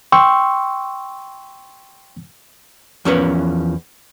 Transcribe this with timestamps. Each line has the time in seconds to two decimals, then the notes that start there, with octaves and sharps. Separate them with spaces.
0.12 G5 C6 C#6 E6
3.05 E2 F3 C#4 A#4 B4 C#5